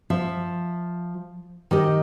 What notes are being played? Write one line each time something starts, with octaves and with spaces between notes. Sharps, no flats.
F3 E5
D#3 G4 D#5